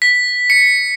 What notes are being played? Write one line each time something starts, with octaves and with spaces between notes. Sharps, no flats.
B6
C#7